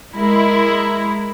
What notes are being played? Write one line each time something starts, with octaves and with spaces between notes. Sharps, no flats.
G#3 E4 A#4